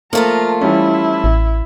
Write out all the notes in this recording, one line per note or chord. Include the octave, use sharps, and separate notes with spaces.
F3 A3 A#3 F4 A#5
E3 G3 C#4 E4
A1